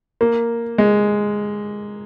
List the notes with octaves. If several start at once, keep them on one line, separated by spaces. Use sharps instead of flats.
A#3
G#3